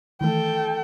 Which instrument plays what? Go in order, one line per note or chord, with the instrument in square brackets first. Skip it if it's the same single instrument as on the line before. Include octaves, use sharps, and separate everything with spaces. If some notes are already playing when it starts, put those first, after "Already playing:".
[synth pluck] D#3 E3 A3 [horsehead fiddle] A4 G5